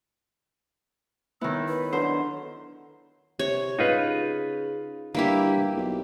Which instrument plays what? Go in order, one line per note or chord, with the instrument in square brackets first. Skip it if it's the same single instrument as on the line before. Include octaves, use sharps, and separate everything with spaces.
[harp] D#3 B3 [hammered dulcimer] E4 C#5 [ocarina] E6
[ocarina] B4
[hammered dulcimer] D3 F#3 [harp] C5
[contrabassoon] C3 [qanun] C#5
[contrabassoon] C#3 [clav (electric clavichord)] D#4 F4 B4
[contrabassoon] G2 [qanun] A#3 E4 G4
[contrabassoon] B1